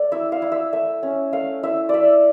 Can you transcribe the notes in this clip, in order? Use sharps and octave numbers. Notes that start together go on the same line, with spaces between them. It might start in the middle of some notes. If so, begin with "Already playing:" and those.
Already playing: A3 D5
E4 E5
F5
E4
E5
A3 E5
C#4
A3 F5
E4 E5
E4 D5 E5